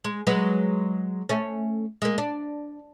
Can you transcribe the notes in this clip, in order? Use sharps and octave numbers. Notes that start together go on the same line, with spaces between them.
G#3
F#3 G#3 B4
A3 C#4
G#3 A#3
D4